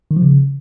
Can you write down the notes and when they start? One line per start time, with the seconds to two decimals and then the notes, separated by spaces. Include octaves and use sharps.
0.11 D#3
0.16 F3
0.22 C#3